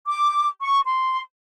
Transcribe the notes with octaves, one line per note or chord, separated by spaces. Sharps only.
D6
C#6
C6